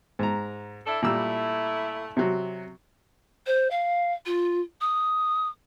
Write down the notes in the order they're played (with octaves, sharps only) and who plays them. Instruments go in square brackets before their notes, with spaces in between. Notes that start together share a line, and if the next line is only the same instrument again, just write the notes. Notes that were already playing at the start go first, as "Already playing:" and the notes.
[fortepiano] G#2 A#5
[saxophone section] D4 E4 A4
[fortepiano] A#2 G3 E6 [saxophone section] A3 E4
[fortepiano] C3 F#3
[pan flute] C5
F5
F4
D#6